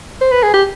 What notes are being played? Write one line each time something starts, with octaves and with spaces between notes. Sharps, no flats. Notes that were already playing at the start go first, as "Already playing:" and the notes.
C5
B4
G#4
G4